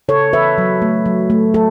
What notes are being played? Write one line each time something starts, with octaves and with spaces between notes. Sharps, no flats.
C#3 A4 C#5
E3 B4 E5
F#3
A3
F#3
A3
F#3 A4